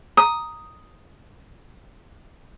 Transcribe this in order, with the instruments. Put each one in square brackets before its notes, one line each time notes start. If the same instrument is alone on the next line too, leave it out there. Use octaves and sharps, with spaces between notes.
[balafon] A#5 [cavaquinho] D#6